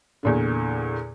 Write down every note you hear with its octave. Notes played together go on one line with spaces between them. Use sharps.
E2 A#2 D3